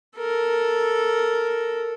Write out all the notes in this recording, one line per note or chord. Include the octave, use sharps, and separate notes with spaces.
A4 A#4